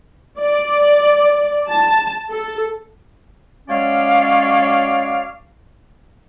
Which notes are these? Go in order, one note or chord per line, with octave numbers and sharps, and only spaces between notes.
D5
A5
A4
F#3 G#3 C#4 C#5 D5 F5